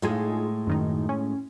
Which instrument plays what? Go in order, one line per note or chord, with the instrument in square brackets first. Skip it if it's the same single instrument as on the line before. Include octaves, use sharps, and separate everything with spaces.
[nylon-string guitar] A2 G#3 [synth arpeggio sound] D#4 F4 G#4
[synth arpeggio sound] F#2 D#3 D#4
C#4